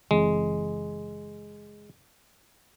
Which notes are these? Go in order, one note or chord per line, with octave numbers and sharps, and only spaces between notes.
F#1 E3 G#3 C4